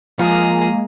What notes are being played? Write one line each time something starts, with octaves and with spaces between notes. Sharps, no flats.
F3 G#3 A#3 G#4 A#5